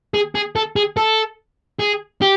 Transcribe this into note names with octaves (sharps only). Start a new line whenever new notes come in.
G#4
G#4
A4
G#4
A4
G#4
G4